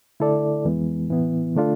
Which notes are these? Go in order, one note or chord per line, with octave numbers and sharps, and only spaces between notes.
D3 A3 E4 A4 D5
F2 E3 G#3 B3
A2 E3 B3 E4
D3 A3 D4 F4 A4